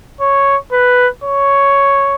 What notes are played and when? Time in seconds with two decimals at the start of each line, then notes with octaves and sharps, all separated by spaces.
0.20 C#5
0.72 B4
1.23 C#5